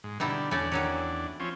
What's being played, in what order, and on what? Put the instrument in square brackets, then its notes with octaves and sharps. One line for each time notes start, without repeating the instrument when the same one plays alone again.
[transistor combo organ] G#2
[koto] B2 D#4 E4 [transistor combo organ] D3 G3
[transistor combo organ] E2 D4 [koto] A3 C#4 D5
[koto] D#3 F#3 C#4
[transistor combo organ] F3 C4 C#4